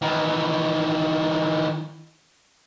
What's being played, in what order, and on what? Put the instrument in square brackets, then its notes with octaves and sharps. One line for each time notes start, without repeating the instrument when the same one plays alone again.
[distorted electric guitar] D#3 E3